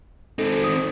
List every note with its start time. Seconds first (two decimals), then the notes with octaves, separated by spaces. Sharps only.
0.39 C4 D#4 A4
0.64 D#6